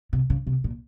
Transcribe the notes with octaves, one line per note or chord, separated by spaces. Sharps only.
C3
C#3
C3
A#2